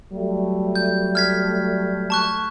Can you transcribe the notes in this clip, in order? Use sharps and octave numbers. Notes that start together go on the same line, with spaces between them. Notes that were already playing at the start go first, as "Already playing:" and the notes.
F#3 G3 A3
G6
F6 G#6 B6
A5 C#6 F#6